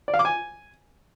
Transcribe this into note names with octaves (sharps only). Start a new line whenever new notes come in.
D5
F5
D6
G#5